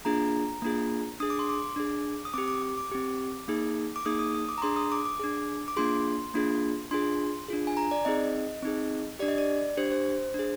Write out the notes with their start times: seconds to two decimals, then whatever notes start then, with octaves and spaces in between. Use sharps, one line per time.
0.05 A#3 D4 F4 G#4 A#5
0.62 A#3 D4 F4 G#4
1.20 D4 G#4 D#6
1.30 D6
1.39 C6
1.49 D6
1.76 D4 G#4
2.25 D#6
2.34 C4 G4 D6
2.48 D6
2.62 D6
2.77 D6
2.91 C4 G4
3.48 A#3 D#4 G#4
3.96 D6
4.06 A#3 D#4 G#4 D#6
4.19 D#6
4.35 D#6
4.49 D6
4.58 A#5
4.62 D4 G#4 C6
4.76 D#6
4.92 D6
5.05 D6
5.20 D4 G#4
5.68 D6
5.77 A#3 D4 F4 G#4 C6
6.34 A#3 D4 F4 G#4
6.91 D4 F4 G#4 C6
7.48 D4 F4 G#4
7.67 G#5
7.77 A#5
7.91 D5
8.05 C4 D#4 G#4 D#5
8.63 C4 D#4 G#4
9.19 D4 G4 D5
9.28 D#5
9.38 D5
9.77 D4 G4 C5
9.92 C5
10.34 D4 G#4